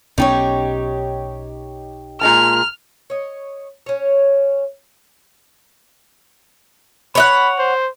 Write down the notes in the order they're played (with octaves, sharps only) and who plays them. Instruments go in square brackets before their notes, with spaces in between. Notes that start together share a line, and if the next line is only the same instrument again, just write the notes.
[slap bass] B1 B3 C#4 [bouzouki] D#4 G4 C#5
[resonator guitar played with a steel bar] A#2 G#3 A5 [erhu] F6
[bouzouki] C#5 D#5
C#4 C#5
[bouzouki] C#5 D#5 F#5 [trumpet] B5
[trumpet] C5